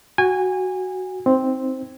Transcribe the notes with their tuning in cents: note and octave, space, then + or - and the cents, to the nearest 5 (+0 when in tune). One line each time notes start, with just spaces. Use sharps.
F#4 +5 G#5 -25
C4 +0 D#4 +15